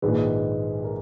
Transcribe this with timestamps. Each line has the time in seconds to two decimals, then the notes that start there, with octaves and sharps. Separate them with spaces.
0.02 A#1 G#2 D#3 G#3 B4
0.84 A#4